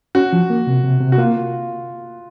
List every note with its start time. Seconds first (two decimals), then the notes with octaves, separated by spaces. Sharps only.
0.15 C#4 F#4
0.33 F3
0.50 A#3
0.67 C3
0.84 C3
1.01 C3
1.12 F#4
1.18 A#3 F4